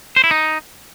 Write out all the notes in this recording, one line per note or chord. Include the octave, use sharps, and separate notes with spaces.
C5
E4
D#4